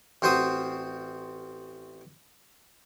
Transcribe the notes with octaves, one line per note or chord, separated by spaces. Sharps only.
A1 C4 F#4 C5 D#6